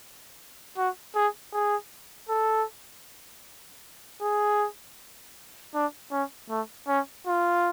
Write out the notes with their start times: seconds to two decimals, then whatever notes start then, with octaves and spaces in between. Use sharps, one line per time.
0.77 F#4
1.15 G#4
1.53 G#4
2.29 A4
4.21 G#4
5.74 D4
6.11 C#4
6.49 A3
6.88 C#4
7.27 F4